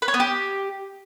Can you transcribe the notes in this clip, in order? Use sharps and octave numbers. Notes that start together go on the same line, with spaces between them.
B4
C#5
B3
G4